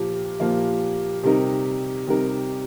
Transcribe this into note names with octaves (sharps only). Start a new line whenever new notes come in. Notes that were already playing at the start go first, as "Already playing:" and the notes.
Already playing: A#2 F3 A#3 G4
A#2 F3 A#3
C3 G3 D#4 G4 A#4
C3 G3 D#4 A#4